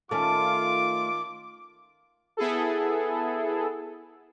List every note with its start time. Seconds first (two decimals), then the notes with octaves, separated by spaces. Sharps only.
0.11 D#3 A3 C#4 F4 D6
2.37 B3 E4 G#4 A4